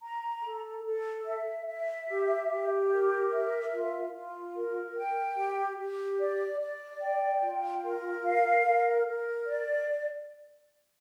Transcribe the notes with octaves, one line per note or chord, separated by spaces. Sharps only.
A#5
A4
A4
E5
E5
G4
G4
A#4
E5
F4
F4
A#4
G5
G4
G4
D5
D5
G5
F4
A#4
F5
A#4
A#4
D5